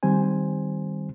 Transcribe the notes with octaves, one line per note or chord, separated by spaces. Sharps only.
D#3 G3 C4 C5 G#5